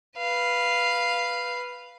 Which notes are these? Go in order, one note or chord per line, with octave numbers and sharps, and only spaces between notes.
B4 F5